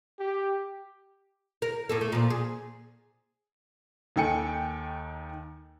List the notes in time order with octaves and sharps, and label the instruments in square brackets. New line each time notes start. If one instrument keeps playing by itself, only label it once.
[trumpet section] G4
[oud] A#4
A2 A#3 A4
A3
A#2 F3
G#4
[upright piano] D#2 D#3 A4 G5 G#5 C#7